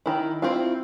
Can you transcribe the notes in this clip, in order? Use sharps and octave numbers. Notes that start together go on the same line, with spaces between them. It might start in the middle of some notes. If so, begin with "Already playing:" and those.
D#3 E4
C4 E4 F4